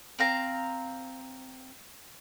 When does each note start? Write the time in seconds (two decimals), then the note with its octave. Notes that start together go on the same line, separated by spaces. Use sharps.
0.19 C4 F5 A#5